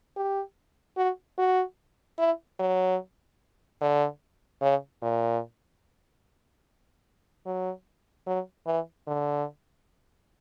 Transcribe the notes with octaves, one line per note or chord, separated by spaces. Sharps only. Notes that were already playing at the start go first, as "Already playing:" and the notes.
G4
F#4
F#4
E4
F#3
D3
C#3
A#2
F#3
F#3
E3
D3